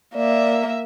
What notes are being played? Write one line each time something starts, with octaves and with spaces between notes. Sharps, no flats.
A#3 D5 E5